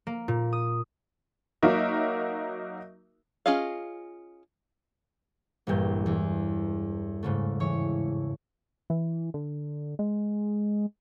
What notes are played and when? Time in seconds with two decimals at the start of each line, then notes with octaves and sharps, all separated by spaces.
0.07 A#3
0.28 A#2
0.53 D#6
1.62 F#3 A#3 D#4 F#4 A#4 E5
3.46 C#4 F4 G#4 D#5 F5
5.67 E1 A#1 G2 G6
6.06 E2
7.23 G#2 C#3 A3
7.60 E3 C#5 C#6
8.90 E3
9.34 D3
9.99 G#3